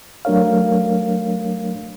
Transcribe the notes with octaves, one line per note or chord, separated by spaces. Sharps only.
F#3 A3 D4 A#4 C#5 F5